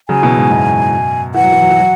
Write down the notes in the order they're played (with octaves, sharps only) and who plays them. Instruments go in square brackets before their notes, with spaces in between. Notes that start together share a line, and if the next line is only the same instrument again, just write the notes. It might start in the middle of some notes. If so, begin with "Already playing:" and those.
[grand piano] C#3 F#3 [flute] G#5
[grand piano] B2 E3
G#2
F#2 B2
[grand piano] E3 [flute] F#5
[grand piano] F#3
E3
F#3
E3
F#3